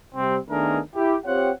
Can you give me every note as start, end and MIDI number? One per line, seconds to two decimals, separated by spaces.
0.15 0.38 48
0.15 0.38 55
0.15 0.38 60
0.50 0.80 51
0.50 0.80 57
0.50 0.80 59
0.50 0.80 62
0.50 0.80 68
0.50 0.80 70
0.96 1.16 64
0.96 1.16 67
1.26 1.51 60
1.26 1.51 65
1.26 1.51 67
1.26 1.51 73
1.26 1.51 78